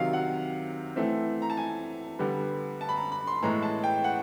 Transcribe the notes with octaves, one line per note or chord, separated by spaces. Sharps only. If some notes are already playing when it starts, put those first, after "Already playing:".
Already playing: C3 D#3 F#3 F5
F#5
E3 A3 C4
A#5
A5
G#5
D3 G3 B3
A5
B5
A#5
B5
C6
A2 E3 G#3 B3 A#5
A5
G5
F#5